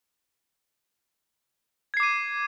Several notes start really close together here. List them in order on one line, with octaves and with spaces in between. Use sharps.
G#6 C7 D6 D#7